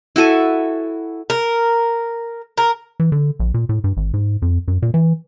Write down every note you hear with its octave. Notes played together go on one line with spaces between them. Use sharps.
E4 F#4 A4 G#5
A#4
A#4
E3
D3
A#1
A#2
A2
G2
G#1
G#2
F2
F#2
A#2
E3